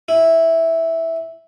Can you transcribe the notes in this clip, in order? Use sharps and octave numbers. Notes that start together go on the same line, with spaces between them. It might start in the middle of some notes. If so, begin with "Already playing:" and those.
E4